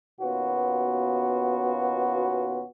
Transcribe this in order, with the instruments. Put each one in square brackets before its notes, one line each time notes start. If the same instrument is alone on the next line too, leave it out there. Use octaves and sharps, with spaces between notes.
[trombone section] D#2 B2 B3 C#4 F4 F#4